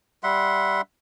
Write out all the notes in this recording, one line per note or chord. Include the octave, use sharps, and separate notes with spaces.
G3 E5 F#5 C6